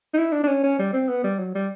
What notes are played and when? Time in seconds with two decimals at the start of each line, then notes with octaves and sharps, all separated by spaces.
0.14 D#4
0.18 E4
0.32 D4
0.43 D4
0.47 C#4
0.63 C#4
0.79 G3
0.93 C4
1.09 B3
1.24 G3
1.39 F#3
1.55 G3